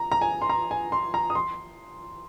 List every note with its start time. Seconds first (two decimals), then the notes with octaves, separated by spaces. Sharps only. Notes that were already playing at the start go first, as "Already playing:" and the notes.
Already playing: A#5
0.12 A#5
0.21 G#5
0.41 C6
0.50 A#5
0.71 G#5
0.92 C6
1.14 A#5
1.30 D#6
1.35 C6